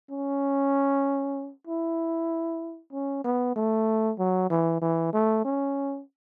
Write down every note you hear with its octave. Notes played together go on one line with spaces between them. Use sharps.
C#4
E4
C#4
B3
A3
F#3
E3
E3
A3
C#4